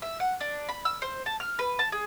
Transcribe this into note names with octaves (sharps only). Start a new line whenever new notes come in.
E5
F#5
D4
B5
E6
C5
A5
F6
B4
A5
G#4